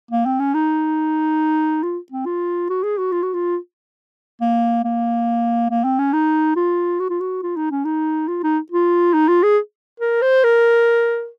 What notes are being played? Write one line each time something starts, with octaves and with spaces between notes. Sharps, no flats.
A#3
C4
C#4
D#4
F4
C4
F4
F#4
G#4
F#4
F4
F#4
F4
A#3
A#3
A#3
C4
C#4
D#4
F4
F#4
F4
F#4
F4
D#4
C#4
D#4
F4
D#4
F4
D#4
F4
G#4
A#4
C5
A#4